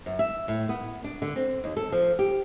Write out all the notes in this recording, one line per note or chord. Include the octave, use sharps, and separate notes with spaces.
F#2
E5
A2
B3
D4
D3
C4
D#2
A4
F3
G4